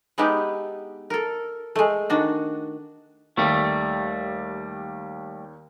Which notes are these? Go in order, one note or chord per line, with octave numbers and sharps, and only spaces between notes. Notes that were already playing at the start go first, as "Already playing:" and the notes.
G#3 B3 D#4 E4 G4
A4 A#4
G#3 A3
D#3 D4 F#4
D#2 G3 A3